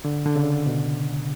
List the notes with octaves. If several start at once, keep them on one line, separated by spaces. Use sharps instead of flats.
D3
D3
C#3
B2